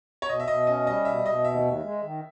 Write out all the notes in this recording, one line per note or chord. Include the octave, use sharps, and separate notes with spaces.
C#5
B2 D#5
E5
B2 D#5
C#4 D#5
G3 D#5
B2 E5
B2 D#5
D#2 E5
D#2
G#3
D#3